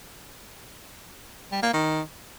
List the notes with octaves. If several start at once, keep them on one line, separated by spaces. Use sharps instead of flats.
G3
A#3
D#3